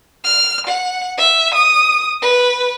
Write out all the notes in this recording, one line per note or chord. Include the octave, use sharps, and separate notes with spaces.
F6
F#5
E5
D#6
B4